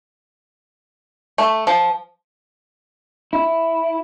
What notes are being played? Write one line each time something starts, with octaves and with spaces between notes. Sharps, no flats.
A3
F3
E4